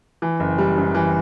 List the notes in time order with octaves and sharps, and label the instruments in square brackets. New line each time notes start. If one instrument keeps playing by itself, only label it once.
[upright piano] E3
F#1
G3
F#2
E3